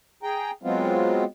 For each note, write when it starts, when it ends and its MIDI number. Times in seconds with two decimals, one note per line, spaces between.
0.23 0.51 68
0.23 0.51 79
0.23 0.51 82
0.63 1.24 54
0.63 1.24 56
0.63 1.24 59
0.63 1.24 60
0.63 1.24 65